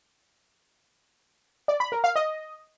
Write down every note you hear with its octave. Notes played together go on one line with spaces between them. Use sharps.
D5
B5
A#4
F5
D#5